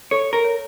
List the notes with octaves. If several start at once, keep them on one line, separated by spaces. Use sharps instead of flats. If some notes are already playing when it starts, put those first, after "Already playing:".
A4 C#5
A#4
C#5